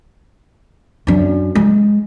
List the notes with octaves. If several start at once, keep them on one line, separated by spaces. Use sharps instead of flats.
F#2 D4
G#3